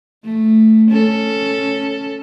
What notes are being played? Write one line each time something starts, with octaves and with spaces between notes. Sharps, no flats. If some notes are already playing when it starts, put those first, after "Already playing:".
A3
C#4 A4